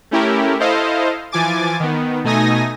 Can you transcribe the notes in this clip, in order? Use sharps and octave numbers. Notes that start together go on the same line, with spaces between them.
A3 C#4 E4 G4 A#4
E4 A4 C5 D#5 F5
E3 F3 G#5 D6 A6
D#3 B3
B2 A3 D#4 G#5 D#6 A#6